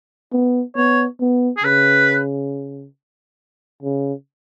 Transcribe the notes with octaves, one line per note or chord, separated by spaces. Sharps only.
B3
B3 C#5
B3
G#4
C#3 B4
C#3